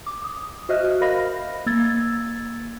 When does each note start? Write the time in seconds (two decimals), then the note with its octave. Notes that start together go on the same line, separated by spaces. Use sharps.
0.06 D6
0.24 D#6
0.69 F#4 C5 D#5 E5 F6 F#6
1.01 A#4 C5 D#5 F5 B5 A#6
1.66 A#3 E6 G#6 A6